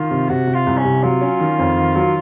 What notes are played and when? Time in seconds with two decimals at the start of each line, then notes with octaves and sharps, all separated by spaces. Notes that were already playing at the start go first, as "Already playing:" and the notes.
Already playing: D#3 F4
0.11 C3
0.29 C3 F#4
0.47 C3
0.54 F4
0.66 C2
0.78 C#4
0.85 C3
1.04 F#3 F4
1.21 C#4
1.40 D#3
1.58 F2
1.77 D#3
1.95 F#3